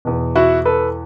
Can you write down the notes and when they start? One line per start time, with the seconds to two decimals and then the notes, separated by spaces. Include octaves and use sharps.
0.05 E2 B2
0.36 E4 F#4
0.65 A4 B4